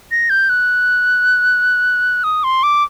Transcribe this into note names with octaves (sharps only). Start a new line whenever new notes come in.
A#6
G6
F#6
D#6
C6
D6